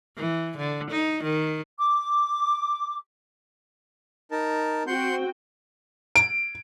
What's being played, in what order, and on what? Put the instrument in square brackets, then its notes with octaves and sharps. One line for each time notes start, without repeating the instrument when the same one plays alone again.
[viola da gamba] E3
D3
D#4
D#3
[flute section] D6
[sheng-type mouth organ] D#4 A#4 A5
[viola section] C4 F#4 G5 [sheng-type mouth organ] F#5 C6 G6
[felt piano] D7